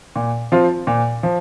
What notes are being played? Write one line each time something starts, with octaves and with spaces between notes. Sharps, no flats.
A#2
F3 C4 F4
A#2
F3